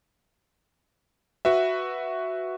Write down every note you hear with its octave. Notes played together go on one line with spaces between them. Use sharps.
F#4 B4 E5